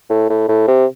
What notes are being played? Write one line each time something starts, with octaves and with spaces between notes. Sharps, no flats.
A2
A2
A2
C3